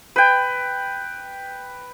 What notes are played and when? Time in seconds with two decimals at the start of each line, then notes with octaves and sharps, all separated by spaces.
0.16 B4 G5